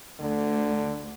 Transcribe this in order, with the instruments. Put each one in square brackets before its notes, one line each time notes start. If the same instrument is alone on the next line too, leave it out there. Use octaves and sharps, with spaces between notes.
[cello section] D2 [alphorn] D3